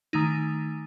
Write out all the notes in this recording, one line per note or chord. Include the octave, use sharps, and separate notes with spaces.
D#3 A3 D#4